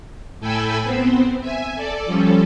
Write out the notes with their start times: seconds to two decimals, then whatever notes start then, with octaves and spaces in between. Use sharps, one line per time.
0.40 A2 A4 G5 G#5 B5 E6
0.83 B3 C4 C5
1.41 E5 G#5
1.75 A4 D5
2.06 F3 G3 C#4 A4